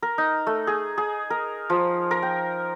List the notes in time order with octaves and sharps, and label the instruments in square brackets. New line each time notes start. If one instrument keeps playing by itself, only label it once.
[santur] A#4
D#4
A3
G#4
G#4
A#4
F3
A#4
G5